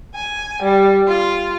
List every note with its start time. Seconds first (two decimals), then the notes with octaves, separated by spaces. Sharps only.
0.14 G#5
0.62 G3
1.08 F4